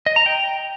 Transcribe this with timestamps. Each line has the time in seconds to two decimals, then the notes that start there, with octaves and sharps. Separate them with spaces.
0.06 D#5
0.16 A#5
0.26 G5